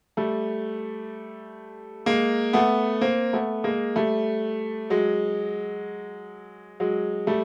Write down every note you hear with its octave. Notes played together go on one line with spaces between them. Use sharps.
G3 A3
G#3 A#3
A3 B3
A#3 C4
A3 B3
G#3 A#3
G3 A3
F#3 G#3
F#3 G#3
G3 A3